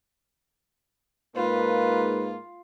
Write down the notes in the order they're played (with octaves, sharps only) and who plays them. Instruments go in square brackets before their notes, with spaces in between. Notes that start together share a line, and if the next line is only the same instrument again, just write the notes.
[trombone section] G#2 A#3 [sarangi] F4 [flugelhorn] B4